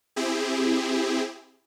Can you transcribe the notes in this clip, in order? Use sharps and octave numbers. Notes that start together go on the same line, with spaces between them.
C4 E4 G4 G#4